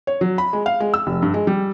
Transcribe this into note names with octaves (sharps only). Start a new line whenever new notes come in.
C#5
F#3
B5
G#3
F5
G#3
E6
F1
G2
G#3
G3